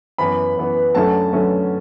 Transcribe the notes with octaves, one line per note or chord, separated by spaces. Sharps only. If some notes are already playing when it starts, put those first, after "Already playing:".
F#2 E3 B3 B5
F#2 E3 B3
F#2 D3 F#3 A3 C#4 A5
F#2 D3 F#3 A3 C#4